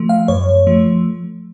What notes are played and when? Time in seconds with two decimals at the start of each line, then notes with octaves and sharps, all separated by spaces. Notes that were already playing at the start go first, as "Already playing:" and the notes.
Already playing: F3 A3
0.09 F5
0.28 F#2 C#5
0.67 F3 A3